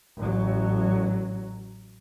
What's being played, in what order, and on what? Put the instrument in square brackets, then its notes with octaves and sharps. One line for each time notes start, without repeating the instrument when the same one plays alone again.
[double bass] A1 F#3